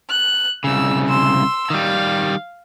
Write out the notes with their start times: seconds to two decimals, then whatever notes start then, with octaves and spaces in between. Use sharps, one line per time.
0.10 F#6
0.64 C2 C#3 E6
1.07 C6 E6
1.70 D#3 G3 F5